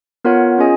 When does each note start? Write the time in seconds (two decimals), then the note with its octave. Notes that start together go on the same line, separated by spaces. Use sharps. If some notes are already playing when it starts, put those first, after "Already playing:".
0.24 B3 F4 A#4 C#5 F#5
0.58 C#4 F4 G#4 D#5 G#5